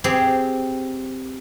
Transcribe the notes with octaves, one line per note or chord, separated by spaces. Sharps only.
C4 G4 G#4